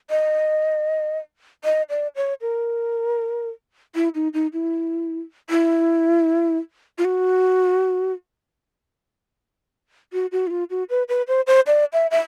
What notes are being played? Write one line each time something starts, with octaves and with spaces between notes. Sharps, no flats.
D#5
D#5
D5
C#5
A#4
E4
D#4
D#4
E4
E4
F4
F#4
F#4
F#4
E4
F4
F#4
B4
B4
C5
C5
D5
E5
E5